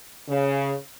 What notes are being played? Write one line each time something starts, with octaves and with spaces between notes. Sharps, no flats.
C#3